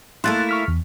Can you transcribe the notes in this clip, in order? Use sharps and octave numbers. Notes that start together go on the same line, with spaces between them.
A3 A#3 E4 C6 F#6 A6
C#6 F6 B6
E2